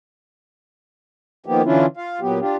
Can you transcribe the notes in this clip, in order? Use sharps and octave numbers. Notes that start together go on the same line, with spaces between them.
D#3 F3 A#3 B3 G4
D3 E3 C#4 D4 E4 F4
F4 F5
A#2 F#3 B3 G4
D4 F4 G4